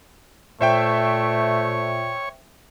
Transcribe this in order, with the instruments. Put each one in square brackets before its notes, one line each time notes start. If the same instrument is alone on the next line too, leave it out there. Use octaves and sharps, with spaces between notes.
[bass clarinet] A#2 [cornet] A3 [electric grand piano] C5 E5 G5 [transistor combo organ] C#5